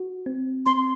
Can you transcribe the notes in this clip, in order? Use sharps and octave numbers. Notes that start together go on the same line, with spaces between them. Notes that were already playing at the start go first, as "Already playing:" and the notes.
Already playing: F#4
C4
C4 C6